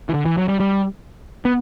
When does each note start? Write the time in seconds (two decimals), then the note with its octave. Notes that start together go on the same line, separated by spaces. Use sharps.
0.09 E3
0.14 D3
0.26 E3
0.38 F#3
0.48 G3
0.60 G3
1.45 B3